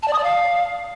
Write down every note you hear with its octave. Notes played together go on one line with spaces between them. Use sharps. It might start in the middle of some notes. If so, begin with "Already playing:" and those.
A5
D5
D#6
D5
F5